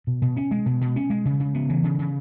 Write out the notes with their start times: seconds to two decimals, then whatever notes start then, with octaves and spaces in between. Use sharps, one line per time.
0.07 B2
0.22 B2
0.36 C#4
0.51 G#3
0.66 B2
0.81 B2
0.96 C#4
1.10 G#3
1.25 C#3
1.40 C#3
1.55 B3
1.69 E3
1.84 C#3
1.99 C#3